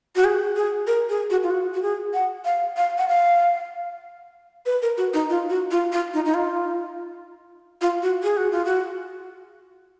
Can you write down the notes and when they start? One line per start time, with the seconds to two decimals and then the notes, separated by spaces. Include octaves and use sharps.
0.16 F#4
0.25 G#4
0.56 G#4
0.87 A#4
1.09 G#4
1.30 F#4
1.43 F4
1.51 F#4
1.74 F#4
1.82 G#4
2.14 F#5
2.45 F5
2.77 F5
2.98 F#5
3.08 F5
4.66 B4
4.82 A#4
4.98 F#4
5.14 D#4
5.30 F4
5.50 F#4
5.71 F4
5.92 F4
6.14 D#4
6.25 D#4
6.34 F4
7.81 F4
8.02 F#4
8.24 G#4
8.37 F#4
8.51 F4
8.65 F#4